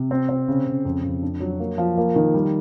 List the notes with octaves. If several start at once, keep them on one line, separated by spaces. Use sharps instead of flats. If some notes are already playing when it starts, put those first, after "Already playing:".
Already playing: C3
C4
C4
C#3
C#3
F2
F2
D4
F#3
A#3
F3
A#3
D#3
G3